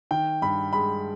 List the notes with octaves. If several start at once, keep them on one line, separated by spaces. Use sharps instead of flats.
D#3 G5
G2 B5
G#3 B5